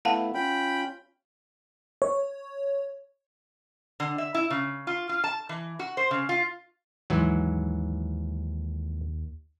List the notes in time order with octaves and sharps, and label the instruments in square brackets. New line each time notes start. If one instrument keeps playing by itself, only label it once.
[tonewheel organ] A3 B3 E4 [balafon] F5 F#5 A5
[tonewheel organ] C#4 F4 [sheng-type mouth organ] G5 B5
[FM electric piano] C#5
[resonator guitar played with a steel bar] D3
E5
E4
C#3
F4
F4
A5
E3
F#4
C5
C#3
F4
[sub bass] D#2 [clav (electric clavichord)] G#2 E3 F#3